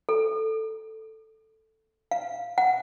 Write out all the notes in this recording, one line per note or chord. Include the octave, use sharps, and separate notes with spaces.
A4
F5
F#5